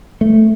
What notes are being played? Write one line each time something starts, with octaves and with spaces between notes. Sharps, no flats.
A3